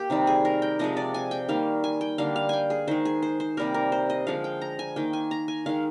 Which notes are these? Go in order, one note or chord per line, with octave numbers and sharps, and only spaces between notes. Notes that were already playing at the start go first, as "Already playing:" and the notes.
Already playing: A#3 G4
C3 D#3 G3
G#4
A#4
G5
C3 F3 G#3 D#5
D5
G#5
G5
D#3 G3 A#3 F5
G#5
G5
D3 G3 A#3 F5
F5
G5 G#5
G#4
D#3 G#3 C5
G#4
C5
C5
C3 G3 A#3 A#4
A#4
C5
D#5
D3 F3 G#3 F5
G5
A#5
G#5
D#3 A#3 G5
G#5
A#5
G#5
D#3 G#3 F5